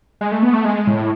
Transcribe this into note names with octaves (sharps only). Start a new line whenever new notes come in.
G#3
A3
B3
A3
G#3
A2